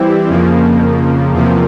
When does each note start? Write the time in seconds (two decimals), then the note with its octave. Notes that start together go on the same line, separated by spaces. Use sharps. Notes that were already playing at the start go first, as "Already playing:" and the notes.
Already playing: E3 G3 C4 E4 G4
0.28 F2 C#3 F3 A#3
1.32 E2 C3 F3 A#3